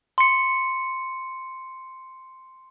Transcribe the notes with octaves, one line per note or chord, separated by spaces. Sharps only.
C6 C#7